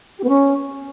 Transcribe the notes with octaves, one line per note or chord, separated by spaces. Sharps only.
G4
B3
C#4